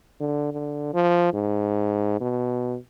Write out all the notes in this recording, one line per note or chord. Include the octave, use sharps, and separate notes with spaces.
D3
D3
F3
G#2
B2